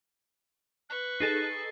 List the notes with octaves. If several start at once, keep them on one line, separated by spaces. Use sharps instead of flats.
B4 C#6 F#6
D#4 G#4 A4 A6 C7